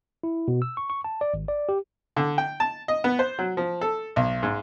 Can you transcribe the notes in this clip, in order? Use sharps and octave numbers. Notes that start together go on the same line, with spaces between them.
E4
B2
E6
C#6
C#6
A5
D5
G#1
D5
G4
D3
G5
A5
D#5
B3
C5
F#3
F3
A4
B1
G#2